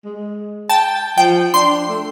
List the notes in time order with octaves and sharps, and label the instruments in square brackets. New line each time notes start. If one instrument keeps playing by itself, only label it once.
[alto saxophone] G#3
[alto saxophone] G5 [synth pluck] A5
[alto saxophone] F3 [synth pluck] G5
[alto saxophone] D4 [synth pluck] C6
[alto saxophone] A3